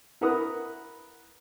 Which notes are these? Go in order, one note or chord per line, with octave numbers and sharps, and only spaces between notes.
E4 A#4 B4 F#5 B5 D#6